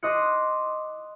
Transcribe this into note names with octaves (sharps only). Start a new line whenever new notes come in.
D#5 C6 D6 D#6 F#6 C#7